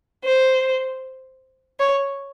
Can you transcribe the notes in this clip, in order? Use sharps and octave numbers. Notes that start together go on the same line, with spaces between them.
C5
C#5